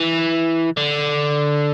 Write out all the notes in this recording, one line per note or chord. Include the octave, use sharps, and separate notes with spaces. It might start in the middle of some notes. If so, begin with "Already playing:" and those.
Already playing: E3
D3